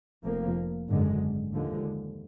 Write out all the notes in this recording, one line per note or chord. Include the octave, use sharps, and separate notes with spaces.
F1 F2 F3 A#3
G#1 F#2 D3 G#3
D#2 D3 F3 G#3